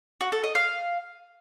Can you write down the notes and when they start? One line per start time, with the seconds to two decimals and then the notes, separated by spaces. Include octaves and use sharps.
0.21 F#4
0.32 A4
0.44 D#5
0.55 F5